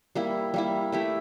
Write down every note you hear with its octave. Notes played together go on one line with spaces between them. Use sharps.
G3 A#3 E4
G3 A#3 E4
A3 E4 G4